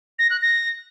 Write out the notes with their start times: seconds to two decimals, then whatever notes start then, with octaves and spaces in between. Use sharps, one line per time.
0.19 A#6
0.30 F#6
0.42 A#6